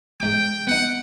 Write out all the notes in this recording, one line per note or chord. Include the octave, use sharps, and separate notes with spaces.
G#2 G5 D6
B3 D#4 F#5